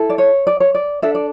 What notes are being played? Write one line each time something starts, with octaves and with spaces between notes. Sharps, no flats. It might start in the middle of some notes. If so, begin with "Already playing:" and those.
Already playing: E4 A4
D5
C#5
D5
C#5
D5
D4 A4 E5
D5